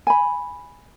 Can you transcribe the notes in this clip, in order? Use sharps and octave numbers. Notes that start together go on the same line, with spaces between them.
G#5 B5